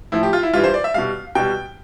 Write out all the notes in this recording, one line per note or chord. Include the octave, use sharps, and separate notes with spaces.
A2 F3 E4
G4
F4
E4
G2 E3 G3 F4
C5
D5
E5
B2 G3 F5
B2 G3 G5